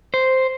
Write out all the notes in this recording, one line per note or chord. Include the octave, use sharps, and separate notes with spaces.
C5